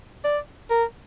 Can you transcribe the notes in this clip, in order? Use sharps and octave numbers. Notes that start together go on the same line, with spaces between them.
D5
A#4